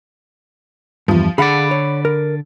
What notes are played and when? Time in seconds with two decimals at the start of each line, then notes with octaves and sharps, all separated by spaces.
1.08 E2 G2 F3
1.38 D3 G#4 D5 F5 F#5 B5
1.71 C#5
2.05 A#4